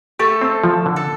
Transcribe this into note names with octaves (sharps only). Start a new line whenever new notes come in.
A3 G4 A4
C4
F3
D3
A4